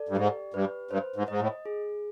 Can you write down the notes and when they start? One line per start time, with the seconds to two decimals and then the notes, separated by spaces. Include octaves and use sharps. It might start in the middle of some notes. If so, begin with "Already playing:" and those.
Already playing: A4 D5
0.09 G2
0.17 G#2 G4
0.54 G2 B4
0.91 G2 C5
1.16 G#2
1.28 G#2 D#5
1.40 A2
1.65 G#4